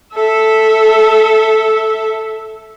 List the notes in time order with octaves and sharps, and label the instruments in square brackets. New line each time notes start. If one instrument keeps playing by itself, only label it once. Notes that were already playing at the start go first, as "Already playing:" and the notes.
[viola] A4 E5